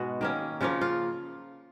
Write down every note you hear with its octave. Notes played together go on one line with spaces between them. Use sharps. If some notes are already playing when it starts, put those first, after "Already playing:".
Already playing: G#2 B2 G#3 B3 F#4
D#3 A#3 C#4
C#3 F3 A#3 F4
F4